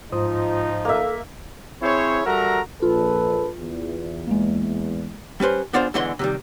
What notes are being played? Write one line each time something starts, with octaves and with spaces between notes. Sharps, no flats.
G#2 F3 D#4 F4 C5 D#6
A#3 A4 E5
C4 E4 G#4 C5 C#5
G3 F#4 A4 A#4 E5 A#5
A#1 F4 A4 B4
E2
G#3 A#3
G3 C#4 B4 C5
B3 D4 F4 G#4 C5
E2 D3 E3 G#3 D#5 C6
C3 D#3 G3